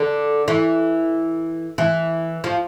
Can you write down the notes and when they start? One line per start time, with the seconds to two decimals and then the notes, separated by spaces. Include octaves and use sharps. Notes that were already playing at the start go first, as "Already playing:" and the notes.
Already playing: D3
0.48 E3
1.78 E3
2.44 F3